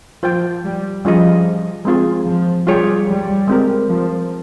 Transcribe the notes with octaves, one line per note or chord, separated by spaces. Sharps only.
F3 F4 C5 G5
G3
F3 G3 C#4 F4 G#4 D#5
G#3 C4 F4 G#4
F3
G3 F4 G#4 C#5 G5
G3
G#3 C4 G4 A#4
F3